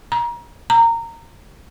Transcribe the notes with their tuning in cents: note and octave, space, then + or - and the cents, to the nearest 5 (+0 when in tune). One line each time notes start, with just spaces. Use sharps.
A#5 +30
A#5 -20